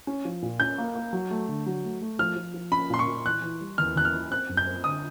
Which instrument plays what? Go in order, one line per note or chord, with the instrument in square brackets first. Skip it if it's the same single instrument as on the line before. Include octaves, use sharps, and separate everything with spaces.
[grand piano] C#4
F3
A#2
[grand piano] C#4 [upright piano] G6
[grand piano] A#3
A#3
F#3
A3
D3
F#3
A3
A3
[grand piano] F3 [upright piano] F6
[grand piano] F3
F3
[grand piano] C#4 [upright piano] B5
[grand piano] A#2 [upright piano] C6
[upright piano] C#6
[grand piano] A#2
[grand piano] E3 [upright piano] F#6
[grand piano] E3
G3
[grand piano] E2 [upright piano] F6
[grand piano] E2 [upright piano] F#6
[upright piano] F6
[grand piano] E3
[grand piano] C4 [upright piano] F#6
[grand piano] F#2
[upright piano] G6
[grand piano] C4
[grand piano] D3 [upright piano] D#6